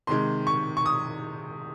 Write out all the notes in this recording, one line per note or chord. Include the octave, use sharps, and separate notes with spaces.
C3 D#3 G#3 C6
C#6
C#6
D#6